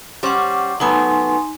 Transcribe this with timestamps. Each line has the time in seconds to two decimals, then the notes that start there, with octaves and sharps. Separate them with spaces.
0.23 G3 C#4 C5 F#5 C#6 D6
0.80 F#3 A3 B3 D#4 G#5 C6